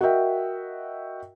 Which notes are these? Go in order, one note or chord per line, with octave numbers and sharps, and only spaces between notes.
F#4 A#4 D#5 E5 G5